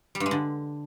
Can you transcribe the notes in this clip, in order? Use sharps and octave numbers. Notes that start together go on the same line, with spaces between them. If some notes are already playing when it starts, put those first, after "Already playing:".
G3
G2
G#3
D3